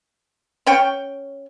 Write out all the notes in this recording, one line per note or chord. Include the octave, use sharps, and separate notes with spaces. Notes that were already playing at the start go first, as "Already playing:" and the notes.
C#4 C#5 G5